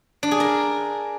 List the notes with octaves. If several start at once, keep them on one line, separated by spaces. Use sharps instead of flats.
D4
G#4
A#4